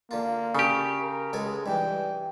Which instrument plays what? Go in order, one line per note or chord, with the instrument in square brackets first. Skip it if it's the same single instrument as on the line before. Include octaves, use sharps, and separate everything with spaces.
[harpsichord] D3 F4 [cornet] A#3
[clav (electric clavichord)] C#3 G4 [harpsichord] A4 A5
[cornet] A#4
[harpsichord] C#2 A4 G#5 [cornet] G#3
[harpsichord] G2 E3 [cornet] G5